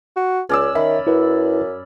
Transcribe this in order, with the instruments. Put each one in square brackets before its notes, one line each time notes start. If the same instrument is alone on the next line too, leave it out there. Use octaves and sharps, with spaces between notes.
[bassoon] F#4
[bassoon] C#2 [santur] C#4 D5 E6
[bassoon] D#3 [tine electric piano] C#5 E5 [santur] B5
[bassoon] F#2 [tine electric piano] E4 B4